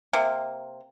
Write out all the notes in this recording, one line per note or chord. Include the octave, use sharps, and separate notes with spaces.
C3 A#3